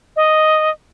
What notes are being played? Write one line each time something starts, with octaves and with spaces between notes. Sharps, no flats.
D#5